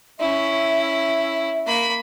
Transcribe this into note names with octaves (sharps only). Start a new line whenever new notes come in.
C#4 E4 E5
A#3 B5